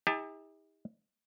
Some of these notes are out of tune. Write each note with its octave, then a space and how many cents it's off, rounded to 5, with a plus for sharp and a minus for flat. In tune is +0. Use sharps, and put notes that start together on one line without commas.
D#4 +45 G4 +45 A5 +0